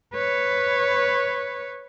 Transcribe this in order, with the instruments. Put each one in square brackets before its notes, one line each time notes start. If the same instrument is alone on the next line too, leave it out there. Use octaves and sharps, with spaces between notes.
[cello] B4 C#5